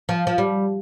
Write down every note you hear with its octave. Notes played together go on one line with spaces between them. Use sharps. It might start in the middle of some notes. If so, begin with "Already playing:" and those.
F3
F3
G3